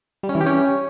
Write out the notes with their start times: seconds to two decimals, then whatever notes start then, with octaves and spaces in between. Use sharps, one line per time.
0.23 G3
0.29 C#4
0.35 E3
0.41 G4
0.46 C#4